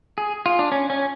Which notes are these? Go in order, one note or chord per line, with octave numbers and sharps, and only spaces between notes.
G#4
F4
D4
C#4
C#4